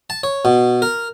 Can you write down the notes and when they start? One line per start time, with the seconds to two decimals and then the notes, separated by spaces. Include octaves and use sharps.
0.10 A5
0.23 C#5
0.45 B2
0.82 A#4